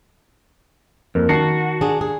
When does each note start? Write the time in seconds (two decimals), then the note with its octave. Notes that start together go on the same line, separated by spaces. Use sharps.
1.15 F2 A#3
1.29 D#3 F#4 A5 C7
1.81 D4 G#4
2.01 G#4